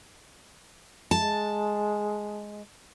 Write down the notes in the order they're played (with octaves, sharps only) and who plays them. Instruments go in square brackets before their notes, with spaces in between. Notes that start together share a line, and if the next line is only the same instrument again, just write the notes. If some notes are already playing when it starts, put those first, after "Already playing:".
[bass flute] G#3 [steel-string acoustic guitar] A5